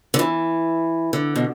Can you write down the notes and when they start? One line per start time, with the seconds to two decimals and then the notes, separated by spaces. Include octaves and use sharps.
0.14 D3
0.19 E3
1.13 D3
1.36 B2